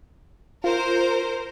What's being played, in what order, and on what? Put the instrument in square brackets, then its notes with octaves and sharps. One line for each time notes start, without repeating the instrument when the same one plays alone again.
[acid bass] F4 [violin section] A#4 C5